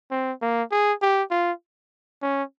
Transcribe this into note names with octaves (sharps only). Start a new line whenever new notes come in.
C4
A#3
G#4
G4
F4
C#4